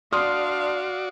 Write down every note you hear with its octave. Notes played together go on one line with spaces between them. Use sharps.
D4 F#4 D5 F5 C6 D#6 F6